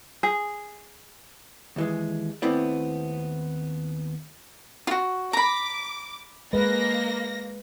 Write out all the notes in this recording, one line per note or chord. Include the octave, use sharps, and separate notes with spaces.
G#4
D#2 E3 G#3
D#2 A3 B3 C4 E4 D5
F4 F#4
A#5 B5 D6
G#3 A#3 B4 A#6